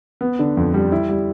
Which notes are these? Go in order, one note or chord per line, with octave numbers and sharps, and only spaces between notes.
B3
D3
F2
G3
E4
G3